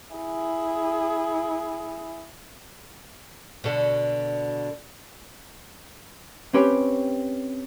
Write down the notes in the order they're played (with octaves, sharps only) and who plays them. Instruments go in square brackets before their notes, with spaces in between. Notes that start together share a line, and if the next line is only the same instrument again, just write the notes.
[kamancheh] E4 G#4
[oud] B2 D3
[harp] C4 C#4 G4 B4 C#5 G5